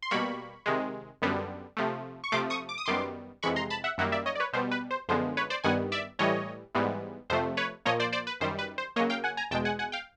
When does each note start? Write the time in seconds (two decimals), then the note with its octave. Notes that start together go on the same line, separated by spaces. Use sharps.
0.02 C6
0.11 B2 G3 A#3 B5 C#6
0.66 C3 D#3 G#3
1.22 F#2 D3 G3 B3
1.77 C3 F3 A3
2.24 C#6
2.32 C3 F3 A3 C6 D6
2.50 C#6 D#6
2.69 D6
2.78 D#6
2.86 F#2 D#3 G3 B3 C6 D6
3.43 F2 C3 E3 G#3 B5 C#6
3.56 A#5 C6
3.70 A5 B5
3.84 E5 F#5
3.98 F#2 D#3 G3 A#3 E5 F#5
4.12 D5 E5
4.26 C#5 D#5
4.35 D5
4.40 B4 C#5
4.53 B2 G3 B3 C5
4.71 B4
4.91 C5
5.08 F#2 D3 F3 G#3 B3 C5
5.37 B4 C#5
5.50 C5 D5
5.64 G2 D#3 G3 B3 F#5 G#5
5.92 D5 E5
6.19 A2 E3 G3 C#5 D#5
6.75 G#2 E3 G3 B3
7.30 F2 C3 F3 A3 C5
7.57 B4 C#5
7.85 A#2 F3 A#3 C#5 D#5
8.00 C5 D5
8.12 C5 D5
8.27 B4
8.41 F#2 D#3 G3 C5
8.59 B4
8.78 C5
8.96 C#3 F#3 A#3 C#5 D#5
9.10 F5 G5
9.24 F#5 G#5
9.37 G#5 A#5
9.51 E2 B2 G#3 G5 A5
9.65 F#5 G#5
9.79 F#5 G#5
9.92 F5 G5